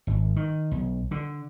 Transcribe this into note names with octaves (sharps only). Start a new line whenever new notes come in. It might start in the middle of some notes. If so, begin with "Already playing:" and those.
G#1
D#3
B1
D3